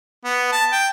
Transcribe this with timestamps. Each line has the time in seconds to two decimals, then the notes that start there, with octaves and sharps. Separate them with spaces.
0.24 B3
0.52 A5
0.72 G5